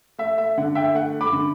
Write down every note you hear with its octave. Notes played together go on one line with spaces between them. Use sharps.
A3 E5
E5
D3 F#5
E5 G5
A3 F#5
B5 D6
D3